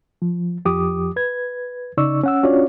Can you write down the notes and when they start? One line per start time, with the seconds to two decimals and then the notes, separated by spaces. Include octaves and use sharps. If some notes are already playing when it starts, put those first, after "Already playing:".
0.22 F3
0.65 F2 F3 G4 D6 D#6
1.16 B4 G#6
1.97 C#3 D#4 D5 C#6 E6
2.23 C#4 F#5 E6
2.43 C#4 D4 F4 F#4 C#5 D5